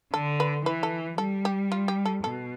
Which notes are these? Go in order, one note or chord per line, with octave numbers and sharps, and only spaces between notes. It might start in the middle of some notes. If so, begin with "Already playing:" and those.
D3 A4
B4
E3 B4
A4
G3 A4
G4
F4
G4
A4
B2 A4